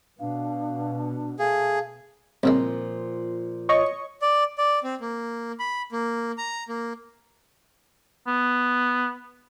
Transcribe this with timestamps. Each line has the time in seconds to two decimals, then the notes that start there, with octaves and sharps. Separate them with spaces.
0.20 B2 D4 F5
1.39 A3 G#4 F5
2.43 C2 A#2 C#3 F3 G#3
3.69 C#5 D#5 C#6
4.22 D5
4.58 D5
4.83 C4
5.01 A#3
5.60 B5
5.92 A#3
6.38 A#5
6.69 A#3
8.27 B3